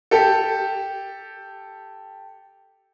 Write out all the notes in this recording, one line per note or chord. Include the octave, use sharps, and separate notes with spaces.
G4 A4